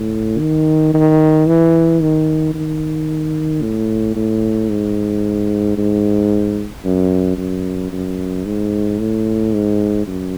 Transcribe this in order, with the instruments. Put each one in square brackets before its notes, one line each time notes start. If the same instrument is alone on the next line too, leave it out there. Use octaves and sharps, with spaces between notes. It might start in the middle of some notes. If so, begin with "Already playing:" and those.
Already playing: [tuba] A2
D#3
D#3
E3
D#3
D#3
A2
A2
G#2
G#2
F#2
F#2
F#2
G#2
A2
G#2
F#2